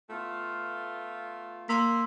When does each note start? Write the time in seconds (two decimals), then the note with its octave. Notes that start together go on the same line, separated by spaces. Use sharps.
0.10 A3 B3 F4
1.69 A#3 C6 E6 B6